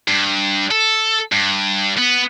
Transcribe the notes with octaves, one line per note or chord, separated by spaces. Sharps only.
G2
A4
G2
B3